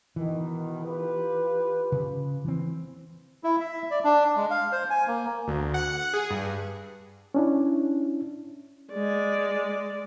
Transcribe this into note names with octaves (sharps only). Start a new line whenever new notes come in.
B2 D#3 E3
F4 G4 B4
C#3
E3 C4
E4
E5
D5
D4
G#3
F5
C5
G#5
A#3
D2
F#5
G#4
G2
C#4 D4 E4
G#3 D5